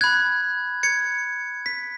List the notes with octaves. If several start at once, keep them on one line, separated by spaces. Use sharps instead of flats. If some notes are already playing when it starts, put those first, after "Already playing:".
B5 F#6 G#6
G#6 C#7
B6